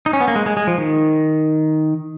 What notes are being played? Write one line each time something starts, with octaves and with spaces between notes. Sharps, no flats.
D#4
C#4
B3
A#3
G#3
G#3
G#3
F3
D#3